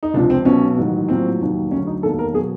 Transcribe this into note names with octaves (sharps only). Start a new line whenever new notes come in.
D#4
C#2 C3 F3 D4
C4
B1 B2 F#3 C#4
A1 G#2 D#3 F#3
A#1 A2 F#3 C4
F1 D#2 D#3 F#3
D2 D3 F#3 C#4
D#4
E1 D#2 D#3 A4
A#4
B2 F#3 G#4